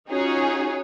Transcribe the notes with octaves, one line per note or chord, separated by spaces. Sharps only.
C#4 D#4 F4 F#4 G#4 C#5